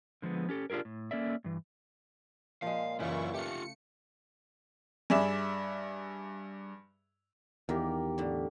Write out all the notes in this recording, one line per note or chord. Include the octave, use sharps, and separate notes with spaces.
D3 F3 G#3 B3
C#4 G4 A4
D4 F4 G4 G#4 A#4
A2
A#3 C#4 A4 D5 E5
G2 E3
A#2 F3 G#3 F5
F#2 C#3 E3 E4 F4 C#6
A3 F4 G4 C#7
G2 G#4 D5 E5 E7
E2 D#3 A#3 G4 A#4
A2 D3